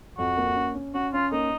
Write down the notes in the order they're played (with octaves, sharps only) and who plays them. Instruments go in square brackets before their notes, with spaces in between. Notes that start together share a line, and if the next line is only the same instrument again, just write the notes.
[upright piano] F2 [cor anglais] F#4
[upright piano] A#3
C#4
C#4
[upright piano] C#4 [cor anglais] F#4
[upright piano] C#4 [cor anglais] F4
[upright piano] A#3 [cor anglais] D#4